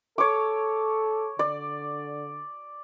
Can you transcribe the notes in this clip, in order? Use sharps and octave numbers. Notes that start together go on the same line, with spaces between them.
A4 C#5 D6
D3 D5